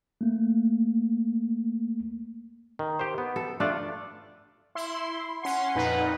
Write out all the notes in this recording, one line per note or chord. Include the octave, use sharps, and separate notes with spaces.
A3 A#3
D#3
G4 C5
B3
A4
A3 D4 F4 D5
E4 C6
C#4 F#5 C6
F2 A#2 D#4 B4